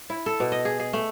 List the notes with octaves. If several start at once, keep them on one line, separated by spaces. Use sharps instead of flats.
E4
A4
B2
D#5
G#4
G#4
A3